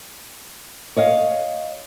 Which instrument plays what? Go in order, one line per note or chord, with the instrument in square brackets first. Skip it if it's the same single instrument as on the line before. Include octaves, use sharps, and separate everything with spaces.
[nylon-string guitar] C#5 D#5 F5